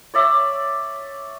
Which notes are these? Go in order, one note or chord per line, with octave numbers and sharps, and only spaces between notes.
C#5 D5 E5